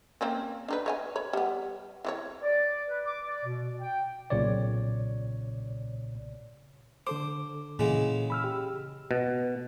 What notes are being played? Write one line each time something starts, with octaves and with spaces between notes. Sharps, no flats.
A#3 C4 C#4
D4 D#4 B4
C#5 D#5 G#5
C#5 B5
G3 B3
E3 E4 C#5
D5
B4
D6
D5
B2
G5
B1 A#2 C#3 C#5 D5
D3 A4 C5 D6
A#2 C#3 E3 F#3 G#3
B5 E6 F6
G4
B2